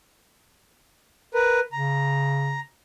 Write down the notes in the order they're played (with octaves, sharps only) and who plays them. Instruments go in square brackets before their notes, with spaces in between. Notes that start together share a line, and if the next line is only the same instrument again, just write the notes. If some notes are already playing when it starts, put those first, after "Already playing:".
[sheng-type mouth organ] A#4 B4
[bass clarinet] C#3 [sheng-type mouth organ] A#5